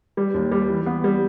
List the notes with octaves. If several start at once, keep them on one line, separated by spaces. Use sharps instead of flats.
G3
D#2
G3
E3
B3
G3